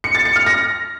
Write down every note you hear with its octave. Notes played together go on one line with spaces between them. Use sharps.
C#7
A6
C#7
F6
A#6